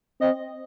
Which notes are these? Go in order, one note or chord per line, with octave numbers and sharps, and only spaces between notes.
C4 D#5